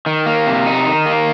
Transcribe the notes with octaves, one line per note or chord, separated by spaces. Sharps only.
D#3
A#3
C3
D#4
D#3
A#3